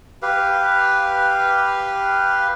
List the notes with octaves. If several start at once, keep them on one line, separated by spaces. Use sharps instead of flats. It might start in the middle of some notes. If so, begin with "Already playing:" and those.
G4 B4 F5